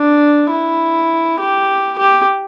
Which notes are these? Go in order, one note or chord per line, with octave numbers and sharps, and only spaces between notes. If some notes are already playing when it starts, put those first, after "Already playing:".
Already playing: D4
E4
G4
G4